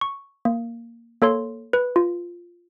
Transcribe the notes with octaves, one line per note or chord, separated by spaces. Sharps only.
C#6
A#3
A#3 A4 C#5 C6
B4
F4